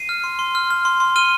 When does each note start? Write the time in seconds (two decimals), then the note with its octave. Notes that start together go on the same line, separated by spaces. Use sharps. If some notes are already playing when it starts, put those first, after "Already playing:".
Already playing: C7 D#7
0.09 F6
0.24 C6
0.39 C6
0.55 F6
0.71 F6
0.85 C6
1.00 C6
1.16 F6 D#7 G7